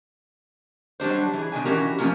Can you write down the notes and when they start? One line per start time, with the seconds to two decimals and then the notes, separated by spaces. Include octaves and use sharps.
1.00 F#3 G3 D4 C5
1.33 E3 G#4
1.52 B2 D#3 D4 G#5
1.65 E3 C#4 F#4 G4 A#4
1.99 F3 A3 A#3 C#4 F4